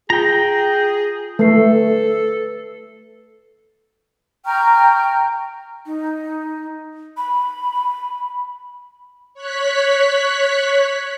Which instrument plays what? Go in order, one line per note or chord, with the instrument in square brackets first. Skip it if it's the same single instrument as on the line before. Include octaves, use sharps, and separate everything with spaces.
[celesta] F4 [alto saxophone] G#4 [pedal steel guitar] G5 A#5
[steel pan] A3 [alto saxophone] A4 [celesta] B4 C7
[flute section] G5 A#5 C#6 F6
[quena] D#4
B5
[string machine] C#5 F#6 B6